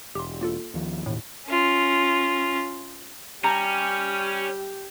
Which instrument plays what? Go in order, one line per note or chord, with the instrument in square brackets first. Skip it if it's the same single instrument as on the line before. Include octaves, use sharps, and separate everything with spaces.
[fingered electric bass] E1 [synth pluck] G4 C6
[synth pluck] A#3 F4 A4
[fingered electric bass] D#2 F3
[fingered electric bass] E1 D#2 [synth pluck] A2
[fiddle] C#4 F4
[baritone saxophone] G3 [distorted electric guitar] C#4 [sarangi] G4 [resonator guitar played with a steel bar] A#5